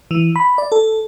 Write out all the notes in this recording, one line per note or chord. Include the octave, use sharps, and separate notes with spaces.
E3
B5
D5
A4